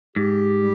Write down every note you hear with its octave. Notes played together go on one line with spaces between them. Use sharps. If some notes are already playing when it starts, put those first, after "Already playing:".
G#2 G4
G3